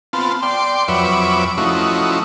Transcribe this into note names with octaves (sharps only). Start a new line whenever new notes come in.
B3 C4 F4 A5
D5 G5 C6
F2 F#3 B4 C#5 E5 D6
F3 A3 C#4 D#4 E4 F#4